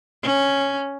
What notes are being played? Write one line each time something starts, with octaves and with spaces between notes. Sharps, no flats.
C#4